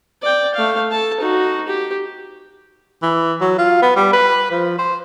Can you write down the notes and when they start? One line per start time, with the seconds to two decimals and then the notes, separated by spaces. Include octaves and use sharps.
0.23 D5 G5
0.55 A3 F5
0.91 A4 A5
1.20 D#4 F#4
1.68 G4
3.03 E3
3.41 F#3
3.59 F4
3.82 B3
3.96 G3
4.14 B4
4.51 F3
4.79 C5